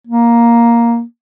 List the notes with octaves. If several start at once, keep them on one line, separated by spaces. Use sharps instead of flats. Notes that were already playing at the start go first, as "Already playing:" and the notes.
A#3